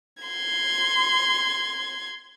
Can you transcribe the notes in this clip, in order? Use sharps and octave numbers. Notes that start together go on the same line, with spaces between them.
C6 G#6